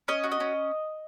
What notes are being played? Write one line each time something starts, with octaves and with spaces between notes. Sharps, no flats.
C#4 D#5
F#4
D#5
C#4